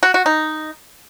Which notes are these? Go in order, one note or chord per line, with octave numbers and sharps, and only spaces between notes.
F#4
F#4
D#4